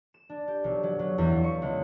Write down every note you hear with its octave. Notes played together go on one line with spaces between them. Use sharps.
E7
D4
G4
B1
F#3
F#3
E2
F5
C#6
C#2